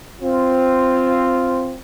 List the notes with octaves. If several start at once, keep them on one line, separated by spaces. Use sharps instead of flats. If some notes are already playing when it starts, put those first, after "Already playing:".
C4 F4